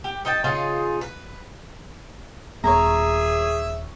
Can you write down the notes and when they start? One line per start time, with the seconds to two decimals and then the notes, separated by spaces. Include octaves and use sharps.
0.04 G4
0.25 D#4 D#5 G5 A5
0.44 C#3 D#4 F4 G#4
1.01 B4
2.64 D#1 B3 G#4 C#5 E5 A#5